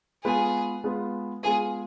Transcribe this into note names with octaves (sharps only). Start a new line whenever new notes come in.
G#3 B3 F4 G#4 B4
G#3 B3 F4 B4
G#3 B3 F4 G#4 B4